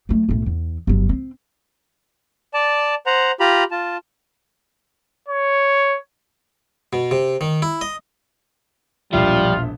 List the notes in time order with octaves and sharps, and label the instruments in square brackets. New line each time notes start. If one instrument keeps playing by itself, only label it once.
[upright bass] F#3 A3
B1 A2
E2
G1 F#3
C4
[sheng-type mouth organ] D5 A5
C5 F#5 A#5
F4 G4 A#5 B5
F4 A5
[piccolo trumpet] C#5
[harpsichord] B2
C3
D#3
E4
D#5
[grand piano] E1 A#1 E5 [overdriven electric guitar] F3 [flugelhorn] G3 [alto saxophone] F4